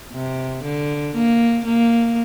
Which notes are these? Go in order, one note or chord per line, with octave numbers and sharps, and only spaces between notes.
C3
D3
A#3
A#3